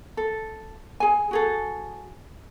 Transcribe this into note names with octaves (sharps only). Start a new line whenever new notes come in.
A4
G#4 G#5
F#4 G#4 A4